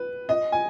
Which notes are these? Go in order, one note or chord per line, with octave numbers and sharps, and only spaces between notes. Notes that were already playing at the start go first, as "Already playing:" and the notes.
Already playing: B4
D#5
G#5